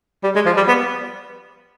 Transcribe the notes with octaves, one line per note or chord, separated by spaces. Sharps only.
G3
G#3
F3
G3
B3